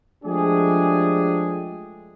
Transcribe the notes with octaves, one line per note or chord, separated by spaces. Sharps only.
F3 G#3 A3 D4 G4 G#4